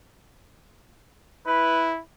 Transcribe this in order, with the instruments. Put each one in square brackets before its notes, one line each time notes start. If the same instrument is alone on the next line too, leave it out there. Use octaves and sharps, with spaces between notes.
[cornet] E4 [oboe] B4